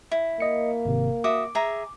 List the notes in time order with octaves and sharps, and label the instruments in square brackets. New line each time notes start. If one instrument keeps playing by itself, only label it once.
[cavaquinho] E4
[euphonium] A#3 [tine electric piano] D#5 C#7
[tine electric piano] G#1 C3
[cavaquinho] F#4 E5 D#6 [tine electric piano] D6
[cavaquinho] G#4 E5 A#5